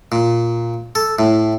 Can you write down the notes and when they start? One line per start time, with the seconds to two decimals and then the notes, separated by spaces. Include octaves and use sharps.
0.12 A#2
0.95 A4
1.19 A2